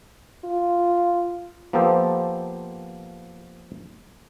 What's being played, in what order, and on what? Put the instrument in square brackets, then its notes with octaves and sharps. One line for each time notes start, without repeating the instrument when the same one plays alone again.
[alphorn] F4
[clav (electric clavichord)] F3 A#3 B3 G4 A4 C5